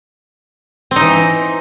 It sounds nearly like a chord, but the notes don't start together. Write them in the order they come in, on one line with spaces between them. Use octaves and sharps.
C4 D#4 E3